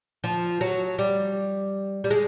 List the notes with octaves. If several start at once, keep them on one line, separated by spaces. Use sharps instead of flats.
F3
F#3
G3
G3
G#3